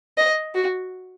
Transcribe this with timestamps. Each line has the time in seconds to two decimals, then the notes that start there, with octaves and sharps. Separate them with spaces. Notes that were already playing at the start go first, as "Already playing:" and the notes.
0.17 D#5
0.55 F#4